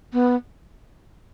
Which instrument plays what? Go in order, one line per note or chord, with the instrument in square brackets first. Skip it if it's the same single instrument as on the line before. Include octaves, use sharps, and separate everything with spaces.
[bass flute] B3